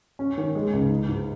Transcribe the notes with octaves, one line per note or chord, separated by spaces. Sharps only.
C#4
D#3
G#3
C#2
D#4
G#2